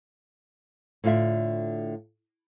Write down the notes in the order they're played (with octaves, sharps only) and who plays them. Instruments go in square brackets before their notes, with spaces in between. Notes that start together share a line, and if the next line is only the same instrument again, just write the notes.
[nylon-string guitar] A2 D3 F4 D5 E5